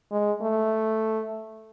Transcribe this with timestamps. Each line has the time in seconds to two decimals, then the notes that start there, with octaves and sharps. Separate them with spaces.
0.12 G#3
0.42 A3